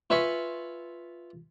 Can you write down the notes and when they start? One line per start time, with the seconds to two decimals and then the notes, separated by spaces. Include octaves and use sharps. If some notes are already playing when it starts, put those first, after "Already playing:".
0.10 F4 B4 E5 G#5 B5 C#6